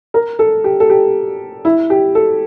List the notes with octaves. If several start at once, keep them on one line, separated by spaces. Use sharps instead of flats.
A#4
A4
G4
A4
G4
E4
G4
A4